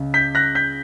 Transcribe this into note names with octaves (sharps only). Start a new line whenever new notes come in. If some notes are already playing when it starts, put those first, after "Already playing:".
Already playing: C#2 C#3
G6 B6
F#6 A#6
G6 B6